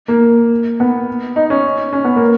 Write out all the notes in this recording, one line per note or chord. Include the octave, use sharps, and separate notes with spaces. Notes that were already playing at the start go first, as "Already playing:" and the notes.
A#3
B3
D#4
C#4
C#4
B3
A#3